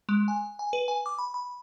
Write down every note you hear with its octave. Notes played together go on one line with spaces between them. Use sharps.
G#3
G#5
G#5
B4
G#5
D6
B5
B5